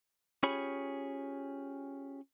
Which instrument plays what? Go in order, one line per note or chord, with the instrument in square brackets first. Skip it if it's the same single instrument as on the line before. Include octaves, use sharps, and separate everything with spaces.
[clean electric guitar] C#4 F4 G4 G#4 C#5 B5